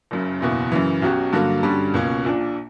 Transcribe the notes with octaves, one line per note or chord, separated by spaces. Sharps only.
F#1 F#2 C#3
F#1 E2 B2 A#3
F#2 C#3 E3
B1 B2 F#3 C#4 G4
G2 D3 F#3 A#3
G2 D3 G3 C#4 F#4
C#2 B2 A#3 C#4
A#1 A#2 A#3 D4